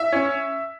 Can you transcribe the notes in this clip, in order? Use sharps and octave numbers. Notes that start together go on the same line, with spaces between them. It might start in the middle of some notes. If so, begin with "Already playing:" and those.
Already playing: E5 E6
C#4